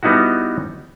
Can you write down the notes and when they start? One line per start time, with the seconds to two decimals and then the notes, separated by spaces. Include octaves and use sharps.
0.03 G3 B3 D#4 E4 F#4